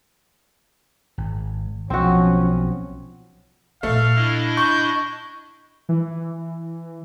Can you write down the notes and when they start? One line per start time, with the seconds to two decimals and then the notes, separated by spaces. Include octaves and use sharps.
1.18 G#1
1.90 B1 F3 C4 C#4 F#4
3.83 A#2 A3 F4 F5
4.17 D4 E4 D#5
4.57 C#6 G6
5.89 E3